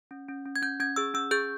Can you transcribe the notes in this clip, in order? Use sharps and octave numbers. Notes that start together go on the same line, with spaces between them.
C#4
C#4
C#4
G#6
C#4 G6
C#4 G#6
G#4 E6
C#4 E6
G#4 G6